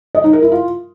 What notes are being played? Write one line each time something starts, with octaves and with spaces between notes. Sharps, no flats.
D#5
D#4
A#4
E4
F4